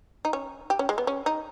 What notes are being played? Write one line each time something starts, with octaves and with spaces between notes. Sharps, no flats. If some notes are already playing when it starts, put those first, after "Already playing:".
D#4
C#4
G4
C#4
G#3
B3
C#4
D#4